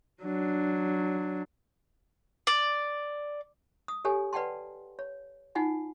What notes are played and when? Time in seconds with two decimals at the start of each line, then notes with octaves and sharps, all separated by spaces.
0.23 F#3 D4
2.47 D5
3.88 D#6
4.05 G4 A4 C#5 G#5
4.33 B4 D5 F#5 G5 A5 C6
4.99 C#5
5.55 D#4 F4 F#5 G#5